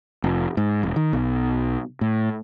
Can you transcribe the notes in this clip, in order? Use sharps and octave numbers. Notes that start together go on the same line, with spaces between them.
F1
G#2
E1
D#3
B1
A2